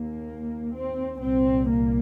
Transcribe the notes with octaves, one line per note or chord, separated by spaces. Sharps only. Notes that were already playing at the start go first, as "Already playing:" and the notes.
Already playing: D#2 A#3
C4
C2 A#2 C4
A#3